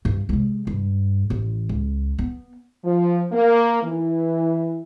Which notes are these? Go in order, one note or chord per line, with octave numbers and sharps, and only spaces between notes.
G2
C3 G#3
G2
A1 E3
C#2
B3
F3
A#3
E3